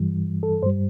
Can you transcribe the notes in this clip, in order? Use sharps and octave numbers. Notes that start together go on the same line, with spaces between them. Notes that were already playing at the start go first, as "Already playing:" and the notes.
Already playing: G2 E3 G3
A4
G2 G3 C5